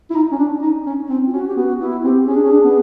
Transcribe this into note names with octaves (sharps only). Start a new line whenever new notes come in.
E4
D#4
C#4
D4
D#4
C#4
C4
F4
C#4 F#4
G4
B3 F#4
B3 E4
C4 G4
G4
C#4 G#4
D4
C#4
D4
B3